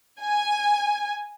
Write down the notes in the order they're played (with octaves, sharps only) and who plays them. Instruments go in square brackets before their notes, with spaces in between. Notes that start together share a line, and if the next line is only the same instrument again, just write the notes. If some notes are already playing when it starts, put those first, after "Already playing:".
[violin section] G#5